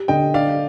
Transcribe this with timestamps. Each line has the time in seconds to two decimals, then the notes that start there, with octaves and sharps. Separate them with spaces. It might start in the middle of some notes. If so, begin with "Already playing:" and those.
Already playing: G4
0.08 D3 D#5 G5
0.34 D4 D5 F5